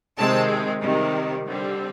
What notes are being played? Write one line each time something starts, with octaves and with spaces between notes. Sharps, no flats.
C3 D#3 G#3 C4 A5
C3 D#3 G3
D3 G3 C4